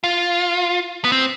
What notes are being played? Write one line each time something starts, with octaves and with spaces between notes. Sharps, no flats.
F4
B3
C4